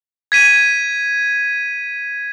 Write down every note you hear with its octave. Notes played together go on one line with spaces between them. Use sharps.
G#6 B6 D#7